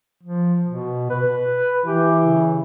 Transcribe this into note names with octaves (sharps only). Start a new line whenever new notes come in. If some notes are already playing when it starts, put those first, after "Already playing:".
F3
B2
B4
E3 G4
C#3